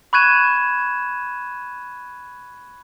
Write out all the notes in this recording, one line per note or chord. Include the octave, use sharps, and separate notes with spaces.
B5 C#6 F#6 G#6 D#7 E7